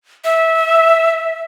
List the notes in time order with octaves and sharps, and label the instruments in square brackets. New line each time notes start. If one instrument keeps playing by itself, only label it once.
[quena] E5